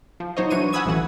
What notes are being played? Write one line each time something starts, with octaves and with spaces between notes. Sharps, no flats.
F3
F#3 D#4 C5 C#5 D#5
E3 F#3 D4 B4 C#6 D#7
F#5 G#5 B5 D#6 E6 G#6
A1 D2 E3 F#3 F#5